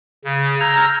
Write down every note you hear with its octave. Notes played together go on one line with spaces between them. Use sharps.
C#3
A#5 E6 F6 G6 G#6 A#6